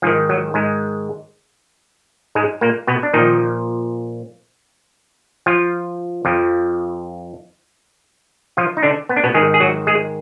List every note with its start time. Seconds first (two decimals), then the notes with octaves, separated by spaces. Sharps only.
0.02 G#2 D#3 F3
0.29 F#3
0.54 G#2 G#3
2.35 G#2 G#3
2.61 A#2 A#3
2.87 B2 B3
3.03 D4
3.13 A#2 D#3 F3 D#4
5.46 F3 F4
6.25 F2 F3
8.57 F3 F4
8.77 D#4
8.83 D3 D4
9.09 B3
9.16 D4
9.24 B2 B3
9.34 G#2 D#3 G#3 G#4
9.54 G#4
9.60 F#3 F#4
9.87 G#3 G#4